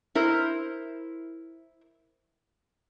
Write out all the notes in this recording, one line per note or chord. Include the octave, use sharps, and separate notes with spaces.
E4 A#4 C5